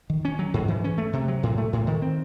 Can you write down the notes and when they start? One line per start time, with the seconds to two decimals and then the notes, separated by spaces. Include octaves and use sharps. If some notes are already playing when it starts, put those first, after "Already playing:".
0.10 D#3
0.25 C#4
0.39 F#3
0.54 G#2
0.68 E3
0.84 C#4
0.98 A3
1.13 C3
1.28 F#3
1.43 A2
1.58 A3
1.73 A2
1.87 D#3
2.02 C4